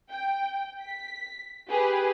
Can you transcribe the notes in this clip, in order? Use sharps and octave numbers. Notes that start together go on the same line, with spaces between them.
G5
B6
G4 G#4 B4